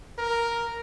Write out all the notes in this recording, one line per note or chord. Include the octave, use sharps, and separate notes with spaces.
A#4